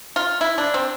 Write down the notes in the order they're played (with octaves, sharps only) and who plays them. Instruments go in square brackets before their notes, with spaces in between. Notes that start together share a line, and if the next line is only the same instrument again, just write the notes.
[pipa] F4
E4
D4
C4